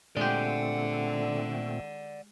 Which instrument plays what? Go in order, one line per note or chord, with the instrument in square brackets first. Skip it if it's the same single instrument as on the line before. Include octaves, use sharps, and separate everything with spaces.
[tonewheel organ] A#2 A3 C4 [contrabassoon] D3 [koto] G#3 G4 [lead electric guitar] D5 F#5